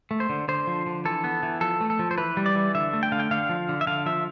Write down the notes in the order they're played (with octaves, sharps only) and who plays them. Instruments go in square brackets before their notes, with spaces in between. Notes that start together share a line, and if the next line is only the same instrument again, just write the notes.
[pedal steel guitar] A3
C5
D3
D3 C5
F3
D3
E3 A4
B3
E3
F3 A4
A3
A4
F3
C5
E3 B4
G3
D5
E3
D3 E5
A3
G5
D3 F5
G5
D3 F5
F3
D3
E5
D3 F5
F3 E5